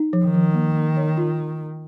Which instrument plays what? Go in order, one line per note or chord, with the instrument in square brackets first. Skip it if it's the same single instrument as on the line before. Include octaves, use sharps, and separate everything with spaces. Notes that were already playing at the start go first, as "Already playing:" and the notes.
Already playing: [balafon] D#4
F3
[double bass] D#3
[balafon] F3
A#3
A#3
C#5
F4